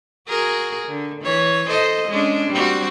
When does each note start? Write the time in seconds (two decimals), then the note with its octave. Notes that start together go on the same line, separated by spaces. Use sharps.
0.28 F#4 G#4 A#4
0.88 D3
1.21 E3 C#5
1.68 A4 C5 D#5
2.09 G#3 C#4 D4
2.51 G3 C4 F#4